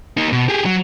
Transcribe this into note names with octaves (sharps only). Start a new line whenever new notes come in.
A#3 D#4
B2
G4 G#4
F#3